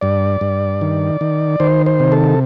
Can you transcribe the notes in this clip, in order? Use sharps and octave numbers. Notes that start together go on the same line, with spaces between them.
G2 D5
G2
D#3
D#3
D#3 C5
C5
C3
A4